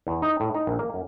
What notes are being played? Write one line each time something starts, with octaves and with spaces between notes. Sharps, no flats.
E2
D#4
A2
D#4
A#1
A#3
F#2